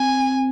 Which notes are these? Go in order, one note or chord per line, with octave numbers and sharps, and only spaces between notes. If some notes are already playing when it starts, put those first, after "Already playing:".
Already playing: C4 G#5